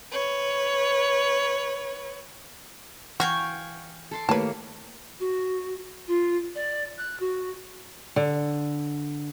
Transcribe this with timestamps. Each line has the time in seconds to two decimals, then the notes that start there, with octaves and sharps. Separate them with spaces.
0.12 B4 C#5
3.20 E3 F#4 F5 G5 G#5 C#6
4.11 A4 C6 D6
4.29 D#3 A3 A#3 E4 G4 B4 C#5 A5
5.19 F#4
6.07 F4
6.55 D5
6.97 F#6
7.19 F#4
8.16 D3